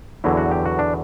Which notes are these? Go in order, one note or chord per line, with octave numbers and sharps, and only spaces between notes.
E2 D3 F#3 E4
F#4
G4
F#4
D4